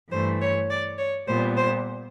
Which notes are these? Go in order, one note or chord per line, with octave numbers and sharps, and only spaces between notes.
G2 E3 A3 C5
C#5
D5
C#5
A#2 G3 B3 C5
C5